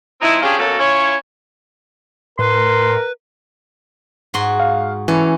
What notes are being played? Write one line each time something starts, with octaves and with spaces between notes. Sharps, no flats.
F3 G#3 C4 D#4 E4
C#4 D4 F4 G4 G#4
F#2 B2 F#3 A#3 F#4 A4
C#4 E4 F4 C#5
A2 A#4 B4 C6
G#2 F#4 C6
F5
E3 C#4 A4